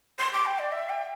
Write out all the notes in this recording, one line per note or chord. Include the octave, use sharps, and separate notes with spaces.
C6
D6
G5
D5
E5
G5